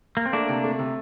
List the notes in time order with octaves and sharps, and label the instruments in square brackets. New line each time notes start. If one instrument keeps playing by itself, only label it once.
[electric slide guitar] A#3
C4
[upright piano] A3 [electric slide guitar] A#3 D4
[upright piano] C3
A3
C3